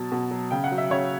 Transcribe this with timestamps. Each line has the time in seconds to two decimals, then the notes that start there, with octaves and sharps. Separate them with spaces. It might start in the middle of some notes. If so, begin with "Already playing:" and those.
Already playing: B2 F#3 A5
0.12 B2
0.31 F#3
0.51 C#3 G5
0.64 F#5
0.72 F#3
0.78 E5
0.90 C#3 C#5